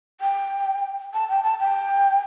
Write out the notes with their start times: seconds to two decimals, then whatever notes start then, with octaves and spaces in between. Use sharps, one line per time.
0.21 G5
1.14 A5
1.29 G5
1.44 A5
1.60 G5